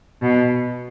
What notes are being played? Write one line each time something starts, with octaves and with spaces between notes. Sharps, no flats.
B2